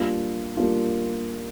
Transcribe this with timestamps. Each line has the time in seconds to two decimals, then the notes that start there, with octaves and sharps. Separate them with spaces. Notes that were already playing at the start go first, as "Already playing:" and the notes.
Already playing: G3 A#3 D4 F4
0.57 G3 A#3 D4 F4